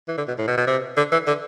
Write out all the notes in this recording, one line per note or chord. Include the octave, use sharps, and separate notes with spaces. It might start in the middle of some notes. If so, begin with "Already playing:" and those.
E3
D3
B2
A2
B2
B2
C3
D3
E3
D3